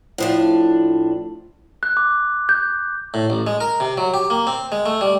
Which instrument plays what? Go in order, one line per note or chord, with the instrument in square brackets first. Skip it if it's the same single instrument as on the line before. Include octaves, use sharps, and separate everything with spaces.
[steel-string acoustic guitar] A2 F3 D4
[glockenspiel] F#6
D6
G6
[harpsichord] A2
A1
G#3
A#4
C3
F#3
G4
A#3
C4
G#3
A3
G3